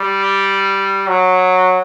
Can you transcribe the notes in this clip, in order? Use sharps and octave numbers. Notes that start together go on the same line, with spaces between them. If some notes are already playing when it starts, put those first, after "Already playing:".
Already playing: G3
F#3